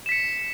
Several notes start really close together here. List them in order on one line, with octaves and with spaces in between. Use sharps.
E7 B6 C#7